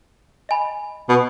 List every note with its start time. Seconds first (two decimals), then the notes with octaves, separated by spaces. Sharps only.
0.49 D#5 G#5 B5
1.09 B2